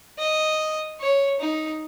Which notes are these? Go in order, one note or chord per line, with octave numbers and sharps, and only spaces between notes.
D#5
C#5
D#4